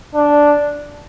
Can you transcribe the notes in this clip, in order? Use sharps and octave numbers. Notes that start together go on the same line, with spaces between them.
D4